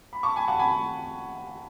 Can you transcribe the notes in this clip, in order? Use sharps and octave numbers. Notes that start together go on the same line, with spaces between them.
B5
A5 C#6
G#5 B5
F#5 A5
G#5 B5